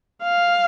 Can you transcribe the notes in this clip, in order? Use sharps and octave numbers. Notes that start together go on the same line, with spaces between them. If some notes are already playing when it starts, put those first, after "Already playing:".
F5